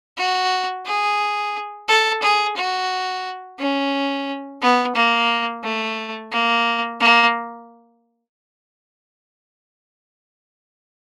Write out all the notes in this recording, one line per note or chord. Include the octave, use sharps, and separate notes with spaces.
F#4
G#4
A4
G#4
F#4
C#4
B3
A#3
A3
A#3
A#3